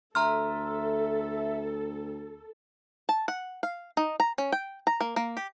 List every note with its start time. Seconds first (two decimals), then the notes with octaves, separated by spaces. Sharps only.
0.15 D2 A4 E5 A#5 C6 F6
3.09 A5
3.28 F#5
3.63 F5
3.97 D#4
4.20 A#5
4.38 C#4
4.52 G5
4.87 A#5
5.01 A#3
5.16 A#3
5.37 G4